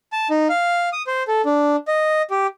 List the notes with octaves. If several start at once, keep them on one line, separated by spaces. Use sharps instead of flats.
A5
D#4
F5
D#6
C5
A4
D4
D#5
G4